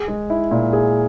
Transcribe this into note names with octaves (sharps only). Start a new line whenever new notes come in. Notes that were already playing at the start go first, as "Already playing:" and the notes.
Already playing: G#4
G#3
E4
A#2
G#4